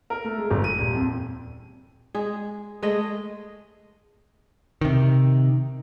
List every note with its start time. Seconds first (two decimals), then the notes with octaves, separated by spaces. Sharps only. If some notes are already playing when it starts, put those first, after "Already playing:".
0.10 A#4
0.25 A3
0.38 G#3
0.51 G1
0.64 D#7
0.78 D#1
0.94 F2
2.15 G#3 G#4
2.83 G#3 A3 G#4 D#5
4.81 C3 D#3